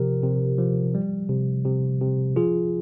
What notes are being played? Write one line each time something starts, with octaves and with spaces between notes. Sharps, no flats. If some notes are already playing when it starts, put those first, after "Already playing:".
Already playing: C3 F3 G4 A#4
C3
F3
G3
C3
C3
C3
F3 F4 G#4